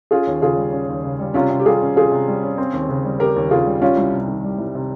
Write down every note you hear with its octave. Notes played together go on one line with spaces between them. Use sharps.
C#4 F4 G#4
D#2
C#3 F4 G#4
G3
C#4
D#2
C#3
G3
C3 C#4 F4
C3
G4
G3 F4 G#4
C#4
C3 F4 G#4
C3
G3
C#4
C4
D#2
C#3
G3
C4 G4 A#4
D#2
C#3 F4 G#4
G3
G3 C#4 F4
C2
C3
D#3
G3
C2
C3